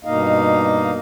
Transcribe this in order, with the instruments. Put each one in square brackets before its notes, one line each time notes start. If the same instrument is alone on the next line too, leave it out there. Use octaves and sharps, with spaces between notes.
[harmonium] G2 B2 A#3 D#4 D#5 F5